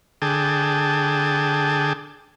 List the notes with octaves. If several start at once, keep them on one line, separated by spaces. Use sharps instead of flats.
D3 G#4 G5 A5